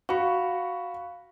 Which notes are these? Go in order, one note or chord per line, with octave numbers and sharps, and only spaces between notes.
F#4 F5 B5 C#6